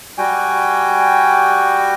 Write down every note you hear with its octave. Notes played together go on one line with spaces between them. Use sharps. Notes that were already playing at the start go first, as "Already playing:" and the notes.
G3 F#4 G5 G#5